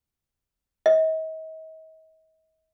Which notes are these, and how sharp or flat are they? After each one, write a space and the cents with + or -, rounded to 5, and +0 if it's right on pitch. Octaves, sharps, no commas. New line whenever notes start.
D#5 +40